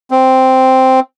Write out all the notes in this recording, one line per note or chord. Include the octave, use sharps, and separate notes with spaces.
C4